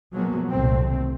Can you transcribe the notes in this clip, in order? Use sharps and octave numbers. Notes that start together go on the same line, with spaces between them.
B2 F3 F#3 G#3 A#3 B3
F1 C2 A#2 D#3 A3 C4